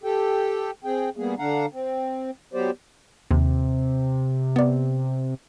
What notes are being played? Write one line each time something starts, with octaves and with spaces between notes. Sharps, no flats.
G4 A4 G5
C4 G#4 G5
G3 A#3 B3 G#4
D3 D4 F5 F#5 A#5
C4
F#3 B3 G4 C5 D5
D#2 C3
B3 D5